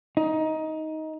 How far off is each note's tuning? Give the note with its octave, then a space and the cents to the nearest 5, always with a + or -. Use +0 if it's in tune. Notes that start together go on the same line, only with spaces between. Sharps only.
D#4 +15